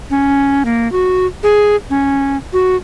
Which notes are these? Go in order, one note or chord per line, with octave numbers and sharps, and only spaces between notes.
C#4
A#3
F#4
G#4
C#4
F#4